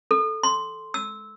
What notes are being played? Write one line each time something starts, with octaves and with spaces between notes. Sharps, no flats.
A4
C6
E6